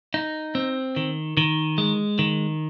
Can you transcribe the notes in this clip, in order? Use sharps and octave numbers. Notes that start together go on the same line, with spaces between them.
D#4
C4
D#3
D#3
G#3
D#3